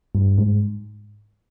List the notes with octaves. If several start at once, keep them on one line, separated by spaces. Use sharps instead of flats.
G2
G#2